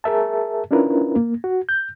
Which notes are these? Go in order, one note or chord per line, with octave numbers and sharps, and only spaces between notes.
G#4 A#4 E5 A5
C#4 D4 E4 F4 A#4 B4
A#3
F#4
G6